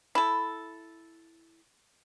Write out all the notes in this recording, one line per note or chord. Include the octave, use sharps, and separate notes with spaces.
E4 A4